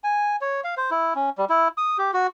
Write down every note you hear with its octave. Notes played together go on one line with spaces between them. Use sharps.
G#5
C#5
F5
C5
E4
C#4
G3
E4
D#6
G4
F#4